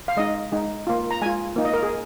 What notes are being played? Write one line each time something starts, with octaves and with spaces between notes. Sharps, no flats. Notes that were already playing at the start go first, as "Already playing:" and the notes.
F5
G#3 D#4 D#5
G#3 D#4
A#3 F4
A#5
G#3 F4 G#5
A#3 D#4
D#5
A#4
G#4